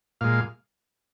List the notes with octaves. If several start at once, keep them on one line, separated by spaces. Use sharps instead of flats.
A#2 G#3 F5